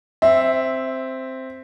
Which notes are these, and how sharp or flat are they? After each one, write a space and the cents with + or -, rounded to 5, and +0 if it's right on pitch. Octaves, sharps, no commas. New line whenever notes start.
C4 +0 E5 +0